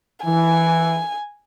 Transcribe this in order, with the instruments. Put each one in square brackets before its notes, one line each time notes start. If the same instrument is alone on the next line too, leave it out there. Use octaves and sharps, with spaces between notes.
[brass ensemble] E3 [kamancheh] G#5